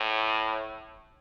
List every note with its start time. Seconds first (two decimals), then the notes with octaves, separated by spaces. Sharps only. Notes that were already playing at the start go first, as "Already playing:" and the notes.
Already playing: A2